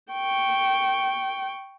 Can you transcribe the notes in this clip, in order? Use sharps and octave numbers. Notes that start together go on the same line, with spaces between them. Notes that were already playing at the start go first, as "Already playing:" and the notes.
G5 C#6